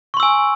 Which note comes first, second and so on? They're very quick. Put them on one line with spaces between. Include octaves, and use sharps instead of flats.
C#6 C6 E6 G#5